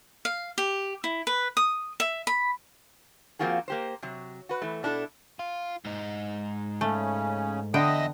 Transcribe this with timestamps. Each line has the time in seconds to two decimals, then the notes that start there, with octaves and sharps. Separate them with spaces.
0.25 F5
0.58 G4
1.04 E4
1.27 B4
1.57 D#6
2.00 E5
2.27 B5
3.39 F3 A#3 C4 F4 F#4 G#4
3.68 A#3 G4 C5
4.03 C3 F#3
4.49 F#4 B4
4.62 E3 A3
4.83 B2 D4 E4 G#4 A4
5.39 F4
5.85 G#2 D#4
6.81 C#3 A3 C#4
7.74 E2 D3 B3 D#5 E5 G5 D#6